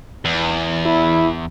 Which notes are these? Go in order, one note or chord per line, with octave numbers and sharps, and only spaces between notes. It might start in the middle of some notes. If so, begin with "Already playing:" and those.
E2
E4